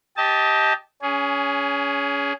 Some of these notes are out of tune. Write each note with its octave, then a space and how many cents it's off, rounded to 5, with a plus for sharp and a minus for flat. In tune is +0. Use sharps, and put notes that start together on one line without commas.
G4 +0 D#5 +20 A5 -10
C#4 +25 G#4 +0